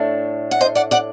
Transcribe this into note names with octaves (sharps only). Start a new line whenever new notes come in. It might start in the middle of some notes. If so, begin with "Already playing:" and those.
Already playing: A2 A3 D4
F#5
C5 D#5
D5 F#5
D5 F#5